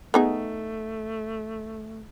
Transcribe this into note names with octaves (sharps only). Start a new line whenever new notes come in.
A3 B3 D#4 G#4